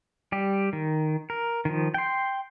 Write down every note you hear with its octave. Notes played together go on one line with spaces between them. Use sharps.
G3 G4
D#3
A#4
D#3 F3
G5 C6